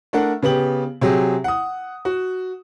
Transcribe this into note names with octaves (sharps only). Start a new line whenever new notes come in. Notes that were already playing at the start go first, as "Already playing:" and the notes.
A3 D4 A4 A#4 F#5
C#3 B3 G4 F#7
C3 F#3 G4 G#4
F#5 D#6
F#4